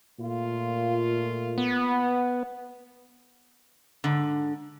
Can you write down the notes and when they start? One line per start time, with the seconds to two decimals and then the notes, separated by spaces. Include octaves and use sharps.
0.20 A#2 A3 F4
1.58 B3
4.04 G#2 D3